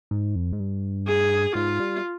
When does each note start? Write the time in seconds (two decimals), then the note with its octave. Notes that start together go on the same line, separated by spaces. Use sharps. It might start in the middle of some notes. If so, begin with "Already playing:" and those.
0.11 G#2
0.36 F2
0.52 G#2
0.60 G2
1.07 G#4
1.55 G#2 F4
1.80 G3